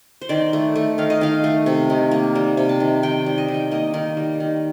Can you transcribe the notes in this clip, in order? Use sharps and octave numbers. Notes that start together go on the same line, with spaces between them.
C5
D#3 D5
A3
A3
D#3 F5
D#5
D#3 F5
A3
C3
D#3
A#3
G3
C3
A5
D#3
D#3 G5
G3
D#5
D#3
G5
A#3 D#5
D#3
G3
D#3